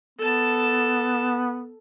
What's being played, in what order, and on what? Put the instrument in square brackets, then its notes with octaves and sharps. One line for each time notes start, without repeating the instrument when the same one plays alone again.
[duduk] B3 [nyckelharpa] A4 A5